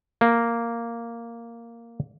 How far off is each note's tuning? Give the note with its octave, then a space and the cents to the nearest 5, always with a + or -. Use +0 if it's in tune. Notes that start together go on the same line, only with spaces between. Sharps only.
A#3 -5